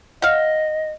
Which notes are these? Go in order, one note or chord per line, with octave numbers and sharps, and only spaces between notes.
D#5 F5 F#5